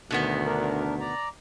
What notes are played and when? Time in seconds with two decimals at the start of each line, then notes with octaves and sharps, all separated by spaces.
0.10 D2 B2 D#3 B3
0.46 D4 A#4
1.00 D5 A#5